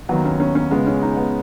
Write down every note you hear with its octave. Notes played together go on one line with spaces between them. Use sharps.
D#2 D#3 F#3 B3
C#4
C#4
C#4
C#2 C#3 G#3 B3
C#4
D#4
B3